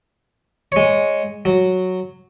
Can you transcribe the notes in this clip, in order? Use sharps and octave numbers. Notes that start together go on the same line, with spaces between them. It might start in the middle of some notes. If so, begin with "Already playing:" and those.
G#3 C#5
F#3